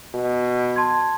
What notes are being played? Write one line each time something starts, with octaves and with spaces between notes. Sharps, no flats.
B2
A5 C6 G#6